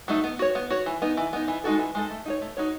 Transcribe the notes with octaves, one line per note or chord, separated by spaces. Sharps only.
F#3 A3 D#4
B3
F#4 C#5
B3
F#4 C#5
E3
B3 D#4
E3
B3 D#4
E3
G#3 D#4 F#4 A4
E3
G#3 D#4 F#4 A4
A3
D#4 F#4 C#5
A3
D#4 F#4 C#5